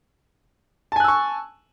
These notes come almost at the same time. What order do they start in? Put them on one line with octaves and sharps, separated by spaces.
A5 G#5 F#6 E6 C#6